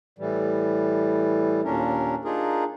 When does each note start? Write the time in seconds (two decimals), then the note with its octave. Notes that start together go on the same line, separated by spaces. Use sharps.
0.18 A2 E3 G3
1.64 D#2 A#2 C#4 D4 A#4
2.25 D4 D#4 F4 G#4 A#4